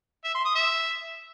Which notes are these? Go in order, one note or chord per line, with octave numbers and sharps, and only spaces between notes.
E5
C6
D#6
E5